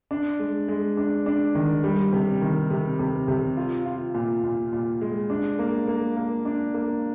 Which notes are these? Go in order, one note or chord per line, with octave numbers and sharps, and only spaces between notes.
D4
G#3
G#3
D4
D4
D#3
G3
C3
D#3
C3
C3
C3
F4
F4
A#2
A#2
A#2
G#3
D4
A#3
A#3
A#3
D4
A#3